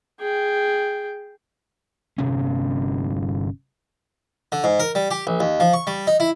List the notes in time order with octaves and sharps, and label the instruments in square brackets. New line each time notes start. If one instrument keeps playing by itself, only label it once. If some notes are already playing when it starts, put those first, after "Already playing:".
[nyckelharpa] G#4 G5
[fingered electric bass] G1 C3 C#4
[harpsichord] D3
G#2
A#4
G3
G4
A#1
D#2
F3
C#6
G3
D#4
E4